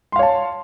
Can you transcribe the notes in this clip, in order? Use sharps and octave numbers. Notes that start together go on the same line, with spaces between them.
C#5 F5 A5 C6